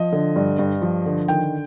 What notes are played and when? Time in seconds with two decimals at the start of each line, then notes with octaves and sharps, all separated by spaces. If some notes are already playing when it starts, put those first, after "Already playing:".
Already playing: F3 D#5
0.12 D3
0.36 G2
0.59 G2
0.82 F3
1.06 D3
1.28 D#3 G5